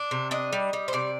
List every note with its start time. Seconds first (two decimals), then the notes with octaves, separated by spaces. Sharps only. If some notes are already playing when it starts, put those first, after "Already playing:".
Already playing: D4
0.11 C3
0.31 D4 D#5
0.53 G3
0.73 G3
0.88 C5
0.93 C3 D5